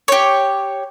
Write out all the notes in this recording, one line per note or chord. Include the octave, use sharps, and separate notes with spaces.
G4 C#5